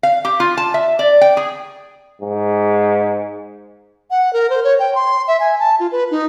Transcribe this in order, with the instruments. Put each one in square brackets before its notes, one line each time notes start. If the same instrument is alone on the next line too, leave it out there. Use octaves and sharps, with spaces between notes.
[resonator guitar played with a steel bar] F5
G4
F4
A5
E5
D5
G5
G#4
[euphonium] G#2
[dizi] F#5
A#4
C5
C#5
G5
C6
E5
G#5
A5
F4
B4
D#4